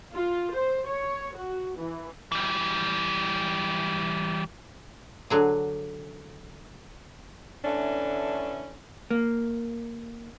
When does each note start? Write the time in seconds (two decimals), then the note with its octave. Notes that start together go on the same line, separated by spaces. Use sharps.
0.14 F4
0.55 C5
0.88 C#5
1.36 F#4
1.77 E3
2.32 E3 G3
5.30 D3 F#3 G#4
7.65 D3 E3 A3 C#4 D4
9.11 A#3